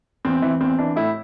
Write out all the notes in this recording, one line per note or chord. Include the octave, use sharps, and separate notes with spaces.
E2 C4
E3
E2 C4
E3 D4
A2 E4